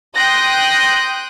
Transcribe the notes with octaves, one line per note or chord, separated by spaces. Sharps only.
G5 C6 D#6 F#6 G6 A#6